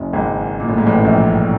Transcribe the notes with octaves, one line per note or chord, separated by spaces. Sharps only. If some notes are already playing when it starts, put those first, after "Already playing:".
Already playing: F#1 F#2
G#1 G#2
A#2
A2
G#2
A1 A2
A#1 A#2